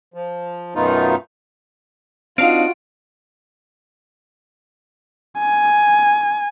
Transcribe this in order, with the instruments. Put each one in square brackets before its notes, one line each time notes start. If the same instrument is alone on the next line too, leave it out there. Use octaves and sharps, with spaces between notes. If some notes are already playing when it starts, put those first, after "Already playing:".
[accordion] F3
F#2 B2 A3 B3 D#4 F4
[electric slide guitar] C4 D4 D#4 [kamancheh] F4 F#4 [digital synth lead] F5 [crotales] D7
[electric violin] G#5